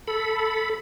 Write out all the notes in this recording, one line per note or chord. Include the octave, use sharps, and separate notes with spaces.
A4 B5